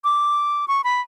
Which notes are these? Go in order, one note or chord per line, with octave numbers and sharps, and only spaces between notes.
D6
C#6
B5